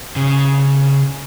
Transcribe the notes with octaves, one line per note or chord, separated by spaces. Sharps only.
C#3